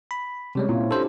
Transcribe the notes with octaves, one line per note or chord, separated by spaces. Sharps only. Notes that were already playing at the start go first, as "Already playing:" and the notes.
B5
C3 G3 G#3 C#4 C#5
A#2 C4 E4 F4
D4 G4 A4 C5